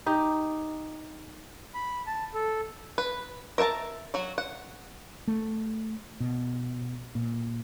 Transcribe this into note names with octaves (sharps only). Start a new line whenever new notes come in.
D#4 G4
B5
A5
A4
B4
A#4 E5 F#5 A5 A#5
F#3 F#4
F#5
A3
B2
A#2